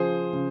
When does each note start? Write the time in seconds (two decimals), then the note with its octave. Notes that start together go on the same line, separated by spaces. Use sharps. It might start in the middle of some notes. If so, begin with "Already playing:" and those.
Already playing: C#3 F3 G#4 C5
0.33 C#3